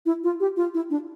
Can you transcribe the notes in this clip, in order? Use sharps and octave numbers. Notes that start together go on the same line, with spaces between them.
E4
F4
G4
F4
E4
D4